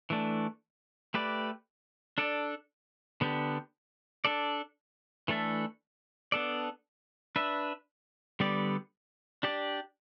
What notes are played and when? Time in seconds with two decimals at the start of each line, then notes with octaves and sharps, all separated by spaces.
0.10 E3 A3 D4
1.14 A3 G4 B4 D5
2.18 D4 A4 D5
3.21 D3 B3 D4 G4
4.25 D4 A4 D5
5.28 E3 A3 D4 A4 E5
6.32 B3 D4 A4 D5
7.36 D4 B4 E5
8.40 D3 G3 B3 G4 D5
9.43 D4 G4 D5